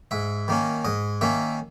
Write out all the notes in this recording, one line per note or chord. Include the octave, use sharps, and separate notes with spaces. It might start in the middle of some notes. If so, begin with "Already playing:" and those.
G#2 E5
D#3 A#3 C#4
G#2 D#5
D#3 A#3 C#4 E5